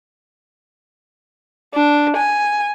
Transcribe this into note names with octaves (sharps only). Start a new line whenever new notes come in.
D4
G#5